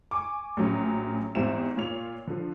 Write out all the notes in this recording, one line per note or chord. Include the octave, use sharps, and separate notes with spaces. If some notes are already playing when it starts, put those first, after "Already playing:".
G#5 C#6 D6
A#1 A2 F#3 C#4
E2 G#2 G3 C4 E4 E7
A#2 F4 C#5 F7
D3 F3